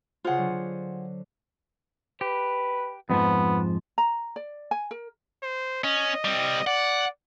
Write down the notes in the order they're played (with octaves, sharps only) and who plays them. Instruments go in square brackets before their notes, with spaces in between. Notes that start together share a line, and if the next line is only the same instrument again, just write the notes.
[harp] C#3 C5 [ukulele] F4 G#4 F#5
[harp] D3 F#3
[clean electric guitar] G4 [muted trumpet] B4
[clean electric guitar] F2 G#2 F3 [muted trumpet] B3
[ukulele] A#5
D5
G#5
A#4
[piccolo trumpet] C5
[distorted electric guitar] C#4 [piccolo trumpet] D#5
[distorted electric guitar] G3 C4
[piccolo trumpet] D5 [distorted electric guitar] F#5